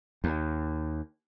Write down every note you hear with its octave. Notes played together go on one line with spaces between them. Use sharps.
D#2